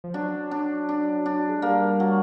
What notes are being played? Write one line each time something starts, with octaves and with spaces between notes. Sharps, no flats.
F3
F#3 D4
D4
D4
D4
G#3
G3 A#3
F#3